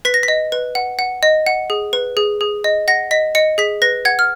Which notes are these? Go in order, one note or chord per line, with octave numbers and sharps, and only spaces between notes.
B4 B6
A#6
B6
D#5
B4
F#5
F#5
D#5
F#5
G#4
B4
G#4
G#4
D#5
F#5 A#6
D#5 B6
D#5 C#7
G#4 B6
B4 A#6
F#5 G#6
F6